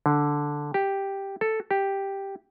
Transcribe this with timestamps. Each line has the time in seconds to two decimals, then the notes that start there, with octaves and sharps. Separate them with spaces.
0.06 D3
0.74 G4
1.41 A4
1.71 G4